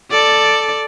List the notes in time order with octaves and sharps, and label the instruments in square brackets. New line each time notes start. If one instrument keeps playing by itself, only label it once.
[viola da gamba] A4 D5